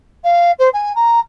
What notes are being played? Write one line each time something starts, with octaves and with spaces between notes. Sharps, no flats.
F5
C5
G#5
A#5